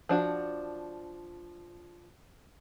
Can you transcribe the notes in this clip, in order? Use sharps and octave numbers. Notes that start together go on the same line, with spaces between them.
F3 D4 F#4